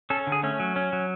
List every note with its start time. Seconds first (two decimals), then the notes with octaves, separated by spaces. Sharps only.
0.10 C#4 A4
0.27 D3
0.32 G#4
0.43 A3 C#4
0.60 F#3
0.76 C#4
0.93 F#3